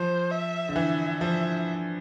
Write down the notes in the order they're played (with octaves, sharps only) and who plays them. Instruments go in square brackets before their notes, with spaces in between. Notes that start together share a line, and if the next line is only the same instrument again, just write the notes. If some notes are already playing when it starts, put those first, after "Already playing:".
Already playing: [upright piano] F3 [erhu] C5
[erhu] E5
[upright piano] D3
[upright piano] E3 [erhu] E5
[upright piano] F3 [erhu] E5